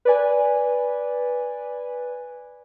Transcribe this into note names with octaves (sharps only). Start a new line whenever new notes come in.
B4 D5 G#5